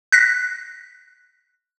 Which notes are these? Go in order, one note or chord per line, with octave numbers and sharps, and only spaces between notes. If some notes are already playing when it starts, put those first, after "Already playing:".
F#6 A#6 B6